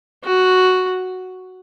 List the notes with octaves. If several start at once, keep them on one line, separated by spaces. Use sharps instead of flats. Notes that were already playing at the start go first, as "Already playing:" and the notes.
F#4